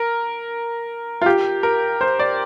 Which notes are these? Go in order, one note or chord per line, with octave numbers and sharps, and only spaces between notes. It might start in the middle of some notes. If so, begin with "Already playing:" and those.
Already playing: A#4
F4
G4
A#4
C5
D5